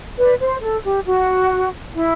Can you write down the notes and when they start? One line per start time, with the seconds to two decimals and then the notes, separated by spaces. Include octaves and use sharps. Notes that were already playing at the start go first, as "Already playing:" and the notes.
0.18 B4 D5
0.40 C5
0.62 A4
0.84 G4
1.06 F#4
1.94 E4